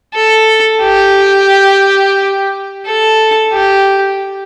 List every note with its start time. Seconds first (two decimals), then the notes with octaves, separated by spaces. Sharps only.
0.14 A4
0.82 G4
2.86 A4
3.53 G4